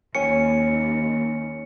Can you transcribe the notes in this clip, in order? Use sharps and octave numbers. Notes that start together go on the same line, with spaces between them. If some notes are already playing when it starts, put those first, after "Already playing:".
D#2 C#4 G#5 C#7